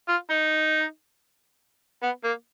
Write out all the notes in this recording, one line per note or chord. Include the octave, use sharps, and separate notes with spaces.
F4
D#4
B3
A#3